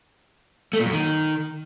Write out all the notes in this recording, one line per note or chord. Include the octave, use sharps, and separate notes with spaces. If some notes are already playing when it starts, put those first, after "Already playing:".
A3
A#2
F#2
D#3